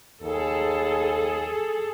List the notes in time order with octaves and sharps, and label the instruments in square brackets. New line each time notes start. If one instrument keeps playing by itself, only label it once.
[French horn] D#2 [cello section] G#4 A4